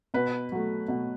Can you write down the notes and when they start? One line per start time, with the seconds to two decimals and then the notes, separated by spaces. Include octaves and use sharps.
0.14 B2 B4
0.52 F#3 A3
0.88 B2